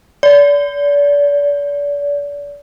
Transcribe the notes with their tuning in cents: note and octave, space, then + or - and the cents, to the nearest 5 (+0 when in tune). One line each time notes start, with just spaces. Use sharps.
D5 -35